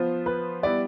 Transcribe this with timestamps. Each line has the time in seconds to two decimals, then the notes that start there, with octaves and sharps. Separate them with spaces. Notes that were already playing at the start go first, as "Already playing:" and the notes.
Already playing: F3 B3 F4 C5
0.26 B4
0.63 G3 B3 E4 D5